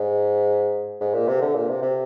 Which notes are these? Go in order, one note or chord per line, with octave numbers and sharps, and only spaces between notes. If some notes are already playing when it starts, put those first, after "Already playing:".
Already playing: G#2
G#2
A#2
C3
D3
A#2
C3
C3